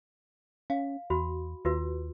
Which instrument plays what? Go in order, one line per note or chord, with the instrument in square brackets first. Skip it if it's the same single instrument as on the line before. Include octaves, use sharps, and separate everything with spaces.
[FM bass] C#4 [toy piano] F5
[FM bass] E2 [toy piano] F#4 B5
[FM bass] D#2 [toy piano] F4 F#4 B4